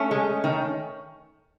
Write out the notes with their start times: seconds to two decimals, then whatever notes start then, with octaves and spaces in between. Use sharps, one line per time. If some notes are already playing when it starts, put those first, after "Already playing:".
Already playing: A3 C#4
0.11 G#3
0.44 D#3